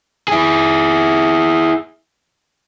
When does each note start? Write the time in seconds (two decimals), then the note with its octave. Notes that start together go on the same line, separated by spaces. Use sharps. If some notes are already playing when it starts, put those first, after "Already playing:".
0.28 E4 G#4